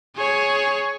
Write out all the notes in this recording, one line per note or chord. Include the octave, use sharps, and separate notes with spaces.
G#4 C#5